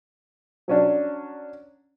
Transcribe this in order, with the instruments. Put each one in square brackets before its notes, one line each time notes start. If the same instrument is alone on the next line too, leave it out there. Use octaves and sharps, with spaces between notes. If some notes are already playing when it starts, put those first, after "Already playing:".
[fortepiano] F#3 C#4 D4